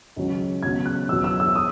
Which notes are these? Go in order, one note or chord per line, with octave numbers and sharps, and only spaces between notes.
C#2 C#3 F#3
C#2 B2 F#3 G#6
F#6
E2 B2 F#3 E6
E6
E6
D#6